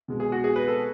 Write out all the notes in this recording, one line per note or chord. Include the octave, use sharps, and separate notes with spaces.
B2 G#3
G#4
F#4
G#4
B4
A4